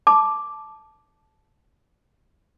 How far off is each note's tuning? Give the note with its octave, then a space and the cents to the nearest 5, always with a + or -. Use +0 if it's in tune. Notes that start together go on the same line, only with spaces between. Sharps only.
A5 -10 D6 +0